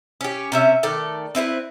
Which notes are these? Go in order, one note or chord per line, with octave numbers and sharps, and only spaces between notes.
C#4 G4
C3 C#4 E5
D#3 A3 A4 D5
C4 E4 A4 B4